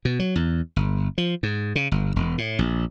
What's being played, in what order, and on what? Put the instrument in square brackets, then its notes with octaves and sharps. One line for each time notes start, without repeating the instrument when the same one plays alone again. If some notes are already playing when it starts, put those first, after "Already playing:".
[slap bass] B2
F#3
E2
G1
F3
G#2
C#3
G1
E1
A2
A#1